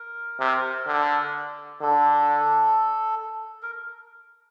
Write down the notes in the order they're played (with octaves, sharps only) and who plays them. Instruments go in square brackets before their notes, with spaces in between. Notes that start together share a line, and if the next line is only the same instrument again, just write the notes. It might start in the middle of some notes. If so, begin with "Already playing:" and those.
Already playing: [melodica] A#4
[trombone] C3
D3
[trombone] D3 [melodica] A4
[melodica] A#4